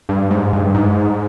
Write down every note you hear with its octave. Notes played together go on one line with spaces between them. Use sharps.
G2
G#2
G2
G#2